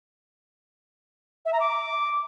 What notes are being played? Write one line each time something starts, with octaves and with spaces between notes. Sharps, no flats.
E5
A#5
D6